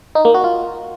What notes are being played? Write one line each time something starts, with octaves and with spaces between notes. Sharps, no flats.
D#4
A#3
F#4
F4